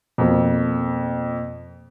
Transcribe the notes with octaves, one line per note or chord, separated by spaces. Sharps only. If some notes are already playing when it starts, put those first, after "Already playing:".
F2 B2 A#3